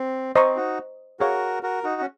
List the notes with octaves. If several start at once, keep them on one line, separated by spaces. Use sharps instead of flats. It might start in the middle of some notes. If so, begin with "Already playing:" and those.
Already playing: C4
C4 C5 D#5 A#5 C#6
D#4 F#4
F#4 G#4 A#4 C#5 F5
F#4 A#4
D#4 F#4
C#4